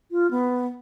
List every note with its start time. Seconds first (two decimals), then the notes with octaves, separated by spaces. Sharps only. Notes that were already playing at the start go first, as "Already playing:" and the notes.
0.11 F4
0.31 B3